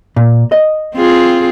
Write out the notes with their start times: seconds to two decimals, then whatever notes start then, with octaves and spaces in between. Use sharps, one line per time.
0.16 A#2
0.52 D#5
0.96 C4 F4 G#4